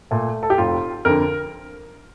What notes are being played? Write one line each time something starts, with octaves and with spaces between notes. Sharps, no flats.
A#2 A3
A4
G4
F1 F4
F2 D3 A#4